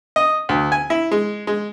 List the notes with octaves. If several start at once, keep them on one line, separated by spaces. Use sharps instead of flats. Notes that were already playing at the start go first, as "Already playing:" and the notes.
D#5
D2
G#5
E4
G#3
G#3